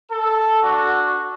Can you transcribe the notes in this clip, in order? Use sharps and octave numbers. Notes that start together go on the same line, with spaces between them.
A4
D4 F#4